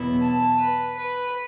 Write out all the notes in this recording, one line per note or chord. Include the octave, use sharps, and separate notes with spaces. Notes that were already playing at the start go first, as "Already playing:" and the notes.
Already playing: E2 B2 F#3 B3 E4
A5
B4
B4